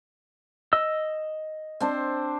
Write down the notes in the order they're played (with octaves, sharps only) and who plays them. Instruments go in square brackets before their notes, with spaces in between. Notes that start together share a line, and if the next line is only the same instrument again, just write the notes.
[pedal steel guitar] D#5 E6
[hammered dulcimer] C4 D4 C5